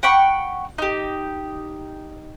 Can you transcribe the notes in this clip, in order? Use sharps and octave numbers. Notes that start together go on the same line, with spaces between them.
F#5 G5 B5 C#6
D#4 G4